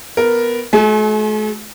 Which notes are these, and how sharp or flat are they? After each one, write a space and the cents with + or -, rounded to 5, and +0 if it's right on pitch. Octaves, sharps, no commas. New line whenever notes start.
B3 +0 A#4 +0
A3 -45 F#4 +0 G#5 +35